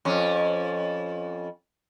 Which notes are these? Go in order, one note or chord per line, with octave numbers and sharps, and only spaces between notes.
F2 C#4